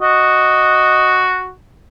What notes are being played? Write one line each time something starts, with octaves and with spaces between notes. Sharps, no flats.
F#4 D#5